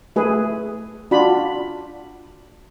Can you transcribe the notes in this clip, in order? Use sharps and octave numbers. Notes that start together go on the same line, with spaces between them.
A3 G#4 B4
D4 F4 F#4 B5